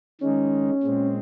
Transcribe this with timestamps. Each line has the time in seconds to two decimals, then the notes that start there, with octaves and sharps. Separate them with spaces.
0.21 D#3 G#3 C#4 D#4
0.83 A#2 G#3 C4